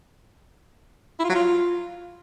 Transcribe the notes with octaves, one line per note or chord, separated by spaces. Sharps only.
E4
F4
F#3
F4